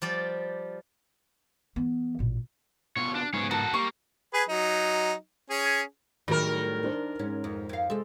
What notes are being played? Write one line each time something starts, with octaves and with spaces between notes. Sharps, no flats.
F3 G3 D5
E3 B3
A1 A#2
B2 F4 C#5
D4
G#2 B3 G#4 C#5
F#4 A4 A#4 A5
G3 A#3 C#6
G#4 B4 G#5
F#3 D#4
C#4 G#4
A2 D#3 F#3 G3 G#4 A#4 A#6
D4 C5
G#2 C#4
F2
F2 F5
C3 G#3 A4